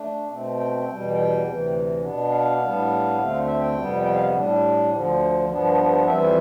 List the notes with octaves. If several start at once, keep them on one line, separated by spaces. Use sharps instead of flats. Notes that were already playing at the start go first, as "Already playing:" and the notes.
Already playing: A3 D4
B2 A3 C4
G5
E2 B2 G3
G5
D2 C3 E3
B2 B3 D4
F5
A2 G3 B3 D4
D2 D3 A3 C4
E5
G5
F2 C3 G3 B3
G5
F5
A2 G3 D4
D2 D3 F3
G2 F3 B3 D4
F2 E3 G3 C4 E5